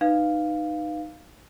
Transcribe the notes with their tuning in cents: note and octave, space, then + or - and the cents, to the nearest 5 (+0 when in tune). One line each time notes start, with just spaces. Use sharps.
D#4 -15 B4 +0 F5 +0